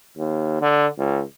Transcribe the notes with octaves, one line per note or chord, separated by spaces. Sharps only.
D#2
D3
C#2